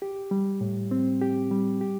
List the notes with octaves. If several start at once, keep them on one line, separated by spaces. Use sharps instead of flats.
G4
G3
A2
C4
G4
G3
G4